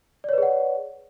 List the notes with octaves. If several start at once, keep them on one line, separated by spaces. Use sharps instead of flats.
G#4 B4 C#5 D5 F#5